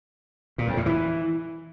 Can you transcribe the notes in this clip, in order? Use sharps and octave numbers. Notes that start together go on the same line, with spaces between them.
A#2
F2
A2
E3